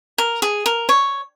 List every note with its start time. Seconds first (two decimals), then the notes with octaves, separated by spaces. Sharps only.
0.18 A#4
0.42 G#4
0.66 A#4
0.89 C#5